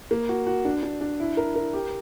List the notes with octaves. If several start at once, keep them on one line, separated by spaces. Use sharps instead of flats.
A#3
F#4
F#4
D4
D4
D4
E4
A#4
A#4
G4